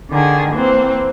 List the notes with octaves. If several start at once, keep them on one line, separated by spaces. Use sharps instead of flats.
D3 D#3 G#4
E3 A#3 C4